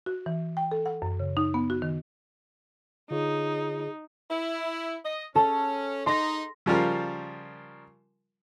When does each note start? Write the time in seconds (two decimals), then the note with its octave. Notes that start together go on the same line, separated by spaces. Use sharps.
0.06 F#4
0.26 E3
0.57 G5
0.71 A4
0.86 F#5
1.02 F#2
1.20 C#3
1.37 D#4
1.54 B3
1.70 F#4
1.82 D#3
3.11 D3 D#4 F4 G#4 C#5
4.31 E4
5.05 D#5
5.35 C#4 A4
6.06 D#4 C6 A#6
6.66 C#3 F3 G3 F4 A#4